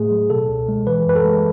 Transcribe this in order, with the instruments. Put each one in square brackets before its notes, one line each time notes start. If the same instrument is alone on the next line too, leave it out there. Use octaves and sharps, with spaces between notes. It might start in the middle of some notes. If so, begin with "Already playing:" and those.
Already playing: [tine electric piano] A2 A3 G#4
F#3
B2 A4
C#2
G#3
E3 B4
F#2 B4
A4
G#3